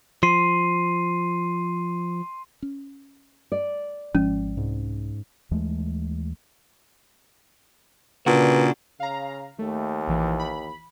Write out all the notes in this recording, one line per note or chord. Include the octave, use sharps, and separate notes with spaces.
F3 C6 C7 D#7
C#4
D5
G#1 F3 G#3 C#4
C2 G#2
D#2 E3 G#3 A3
A#2 C#3 D4 F#4 B4
C#3 F5 A#5
D#2 A3
A#1 E3
B5